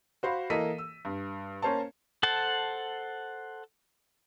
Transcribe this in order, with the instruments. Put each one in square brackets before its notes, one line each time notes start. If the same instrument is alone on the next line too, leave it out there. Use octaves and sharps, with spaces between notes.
[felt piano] F#4 C5 F5 B5
E3 A#3 A4 D#5 B6 D#7
E6
G2
A#3 C#4 C5 C#5 A5
[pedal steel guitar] A4 C5 F#5 A5